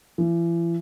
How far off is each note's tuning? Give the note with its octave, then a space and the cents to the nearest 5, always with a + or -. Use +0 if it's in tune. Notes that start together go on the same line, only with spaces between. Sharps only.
E3 +40